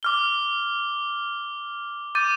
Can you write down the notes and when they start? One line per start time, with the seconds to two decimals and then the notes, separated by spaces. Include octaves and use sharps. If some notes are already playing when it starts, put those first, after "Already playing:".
0.03 D6 F6 G7
2.15 D6 G6 A6 D#7